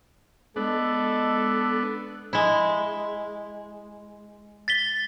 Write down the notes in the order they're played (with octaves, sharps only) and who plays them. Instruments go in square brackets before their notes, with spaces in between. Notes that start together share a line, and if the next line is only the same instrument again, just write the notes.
[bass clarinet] G#3 [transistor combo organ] B3 D4 [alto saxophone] A4
[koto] G#3 E4
[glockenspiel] A6 B6 G7